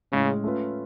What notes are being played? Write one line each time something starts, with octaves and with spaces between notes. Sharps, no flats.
A2 C#3 G#3 C#4
A3 C#4 F4 B4